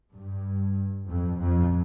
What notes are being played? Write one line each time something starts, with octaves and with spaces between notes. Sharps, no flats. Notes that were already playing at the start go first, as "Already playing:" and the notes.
G2
F2
F2